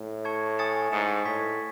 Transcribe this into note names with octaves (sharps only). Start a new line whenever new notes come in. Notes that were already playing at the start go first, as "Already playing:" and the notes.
Already playing: A2
A5 C#6 G#6 C#7
G#5 D#6 A6 C#7 E7
G#2 G#5 D#6 A6 C#7 E7
A2 C#6 G#6 B6